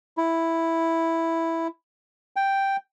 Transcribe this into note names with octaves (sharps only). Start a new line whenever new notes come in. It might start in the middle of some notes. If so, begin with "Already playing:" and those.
E4
G5